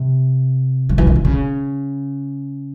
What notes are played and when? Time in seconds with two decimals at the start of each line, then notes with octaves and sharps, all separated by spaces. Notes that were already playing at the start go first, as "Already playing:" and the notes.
Already playing: C3
0.89 F3
0.98 E3
1.07 D#3
1.16 D3
1.25 C#3